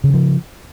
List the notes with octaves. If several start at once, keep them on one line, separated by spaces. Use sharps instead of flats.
C#3 E3 F3